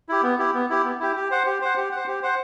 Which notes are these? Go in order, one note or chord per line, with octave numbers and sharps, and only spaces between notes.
E4 G4
B3
E4 G4
B3
E4 G4
B3
E4 G4
G4
C5 F#5
G4
C5 F#5
G4
C5 F#5
G4
C5 F#5